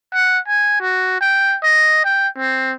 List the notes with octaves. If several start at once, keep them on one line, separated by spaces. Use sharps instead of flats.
F#5
G#5
F#4
G5
D#5
G5
C4